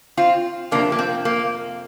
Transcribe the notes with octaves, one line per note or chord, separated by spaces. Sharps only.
C4 F4
F2 C3 F3 A#3 D4
A#3
C4
A#3